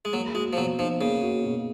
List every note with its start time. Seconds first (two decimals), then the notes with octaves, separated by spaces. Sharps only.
0.05 G#3
0.13 F#3 A#3
0.34 G#3 F#4
0.53 F3
0.57 B2 F#3
0.78 F3 D#4
1.01 C#3 A#3
1.23 F#4
1.44 B2